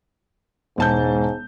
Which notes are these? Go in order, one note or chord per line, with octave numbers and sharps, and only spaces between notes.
E1 G#2 A5 G6